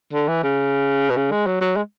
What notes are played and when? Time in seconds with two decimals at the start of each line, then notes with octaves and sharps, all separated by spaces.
0.13 D3
0.28 E3
0.43 C#3
1.10 B2
1.17 C#3
1.31 G#3
1.47 F#3
1.61 F#3
1.76 G#3